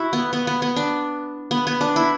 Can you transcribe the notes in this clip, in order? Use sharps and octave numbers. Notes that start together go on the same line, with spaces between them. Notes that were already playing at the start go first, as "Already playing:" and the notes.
Already playing: E4 F#4
B3
B3
B3
B3
D4
B3
B3
D4
E4